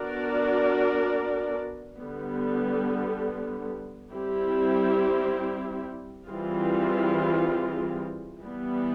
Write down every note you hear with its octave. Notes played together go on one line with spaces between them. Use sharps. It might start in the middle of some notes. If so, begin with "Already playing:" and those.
Already playing: B3 D4 F#4 A#4 D5
D3 G3 B3
G3 C4 E4 G4
E3 G3 C4 F4 G#4
E3 G3 B3